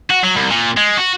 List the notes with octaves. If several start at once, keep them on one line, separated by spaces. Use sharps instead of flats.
F#4
F#3
C2
A#2
G#3
F#4